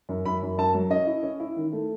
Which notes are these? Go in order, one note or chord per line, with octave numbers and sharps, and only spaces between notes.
F#2
F#2 B5
F#2
F#2 A5
F#3
C#4 D#5
E4
C#4
E4
D#3
A3